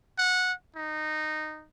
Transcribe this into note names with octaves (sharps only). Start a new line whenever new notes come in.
F#5
D#4